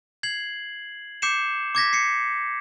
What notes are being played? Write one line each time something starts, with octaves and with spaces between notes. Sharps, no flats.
G#6 C7 F#7
D6 G6 C7 C#7 E7
D6 G#6 A#6 B6
C7 C#7